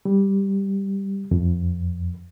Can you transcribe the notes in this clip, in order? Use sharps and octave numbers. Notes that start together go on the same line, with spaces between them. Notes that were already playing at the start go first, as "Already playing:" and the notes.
G3
F2